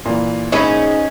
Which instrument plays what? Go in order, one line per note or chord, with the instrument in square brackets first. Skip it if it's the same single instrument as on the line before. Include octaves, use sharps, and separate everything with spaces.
[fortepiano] A#2 E3
[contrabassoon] G#2 [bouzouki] C#4 D#4 G#4 [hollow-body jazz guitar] C#5 E5 B5